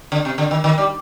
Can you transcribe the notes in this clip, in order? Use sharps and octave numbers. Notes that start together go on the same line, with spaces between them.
D3
C3
D3
D#3
D#3
G3